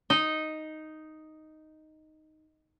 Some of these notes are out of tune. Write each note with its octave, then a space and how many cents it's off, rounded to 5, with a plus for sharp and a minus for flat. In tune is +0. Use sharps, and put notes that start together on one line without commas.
D#4 +0 D#5 +0